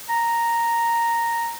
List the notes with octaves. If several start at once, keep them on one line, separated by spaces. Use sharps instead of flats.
A#5